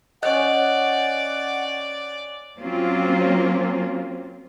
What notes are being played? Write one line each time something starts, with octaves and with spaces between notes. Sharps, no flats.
C#4 D5 D#5 F#5 G5 F#6
F#3 A#3 C4 C#4 F4